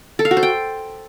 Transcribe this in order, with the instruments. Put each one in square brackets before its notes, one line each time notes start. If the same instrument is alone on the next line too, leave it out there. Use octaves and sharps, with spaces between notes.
[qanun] A4
F5
F#4
C5
G5